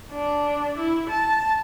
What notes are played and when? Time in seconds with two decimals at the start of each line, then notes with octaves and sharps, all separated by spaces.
0.13 D4
0.78 E4
1.09 A5